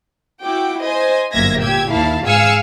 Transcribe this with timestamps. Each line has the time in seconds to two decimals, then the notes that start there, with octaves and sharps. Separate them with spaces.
0.42 E4 F#4 G5 D6
0.83 C5 D#5 G#5
1.33 G1 F#2 A#3 E5 G#6 A#6
1.62 A#2 G4 E6 G#6
1.91 D#2 A#2 E4 F5 A5
2.26 G#2 G#4 F5 G#5 E6 C#7